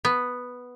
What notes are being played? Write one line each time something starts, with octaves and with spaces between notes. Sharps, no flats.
B3